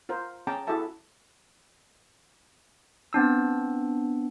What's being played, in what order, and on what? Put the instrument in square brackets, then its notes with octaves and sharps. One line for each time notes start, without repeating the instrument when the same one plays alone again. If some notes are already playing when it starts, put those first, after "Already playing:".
[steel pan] F4 A#4 C5
C#4 G#4 G5 A5 A#5 D6
E4 F#4 G#4 A4 E5 A5
[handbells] B3 C4 D4 E6